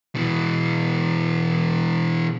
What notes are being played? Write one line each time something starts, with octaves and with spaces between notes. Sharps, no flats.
B2 E3